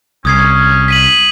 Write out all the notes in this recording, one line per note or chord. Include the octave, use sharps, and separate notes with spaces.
C2 C#4 D#6 G#6 C7
B6 D#7 F#7